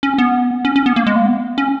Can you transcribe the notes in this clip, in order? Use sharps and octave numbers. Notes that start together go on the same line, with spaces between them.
C#4
B3
C#4
C#4
B3
A#3
G#3
A#3
B3
C#4